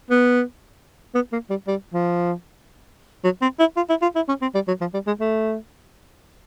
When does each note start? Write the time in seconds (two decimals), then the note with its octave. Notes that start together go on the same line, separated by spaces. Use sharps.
0.10 B3
1.15 B3
1.32 A#3
1.50 G3
1.67 G3
1.93 F3
3.24 F#3
3.41 C4
3.59 E4
3.76 F4
3.89 E4
4.02 F4
4.16 E4
4.28 C#4
4.42 C4
4.54 G3
4.68 F#3
4.81 F3
4.94 G3
5.07 G#3
5.20 A3